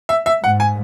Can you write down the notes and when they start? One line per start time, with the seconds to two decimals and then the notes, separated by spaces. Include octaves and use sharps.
0.09 E5
0.26 E5
0.43 G#2 F#5
0.60 G#5